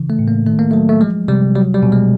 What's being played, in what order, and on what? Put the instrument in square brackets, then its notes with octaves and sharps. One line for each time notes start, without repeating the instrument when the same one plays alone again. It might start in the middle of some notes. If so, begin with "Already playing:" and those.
Already playing: [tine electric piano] C#3 E3
A3
A2
A#3
D#3 A3
A#3
F#3 A3
A3
F3 G#3
C3 G3
F#3 G3
G3
B2
G#3